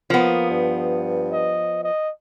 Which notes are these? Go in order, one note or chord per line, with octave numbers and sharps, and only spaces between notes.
F3 A#3 B3
G2
D#5
D#5